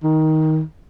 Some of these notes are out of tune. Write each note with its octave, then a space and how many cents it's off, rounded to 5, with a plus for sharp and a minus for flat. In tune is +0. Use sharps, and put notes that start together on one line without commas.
D#3 +10